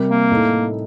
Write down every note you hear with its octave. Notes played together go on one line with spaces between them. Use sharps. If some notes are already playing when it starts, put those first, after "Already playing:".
Already playing: C3 G3 C4 G4 A#4
A#3
A2 A3 D#4 A4